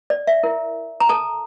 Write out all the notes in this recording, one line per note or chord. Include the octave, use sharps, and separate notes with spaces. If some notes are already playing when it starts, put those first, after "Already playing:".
D5
E5
E4 A#4
A#5
A4 A5